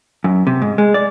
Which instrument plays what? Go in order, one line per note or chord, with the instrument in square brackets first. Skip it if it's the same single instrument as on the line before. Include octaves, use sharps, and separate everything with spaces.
[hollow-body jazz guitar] F#2
C3
G#2
G#3
D5